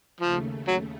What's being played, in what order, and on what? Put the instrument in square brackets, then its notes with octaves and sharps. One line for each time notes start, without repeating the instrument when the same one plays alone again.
[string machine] D#2 C#3 A3 [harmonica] F3
[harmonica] F#3